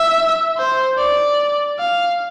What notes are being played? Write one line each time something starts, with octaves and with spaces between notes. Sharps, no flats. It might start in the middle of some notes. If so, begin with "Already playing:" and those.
Already playing: E5
C5
D5
F5